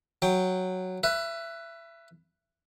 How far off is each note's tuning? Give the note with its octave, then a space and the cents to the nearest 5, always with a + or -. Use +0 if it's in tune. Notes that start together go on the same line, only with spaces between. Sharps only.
F#3 +0 G5 +0
B4 +0 E5 +25